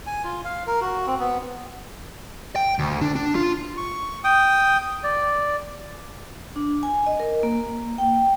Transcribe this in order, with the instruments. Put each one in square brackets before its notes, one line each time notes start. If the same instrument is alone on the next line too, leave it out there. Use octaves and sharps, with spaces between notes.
[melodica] G#5
F4
F5
A#4
F#4
C4
B3
[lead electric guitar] G5
D2
D4
D4
F4
[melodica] C#6
G5 D#6
D5
[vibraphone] D4
G#5
D#5
A#4
A#3
G5